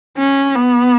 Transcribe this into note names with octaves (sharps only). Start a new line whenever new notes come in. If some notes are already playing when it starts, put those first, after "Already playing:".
C#4
B3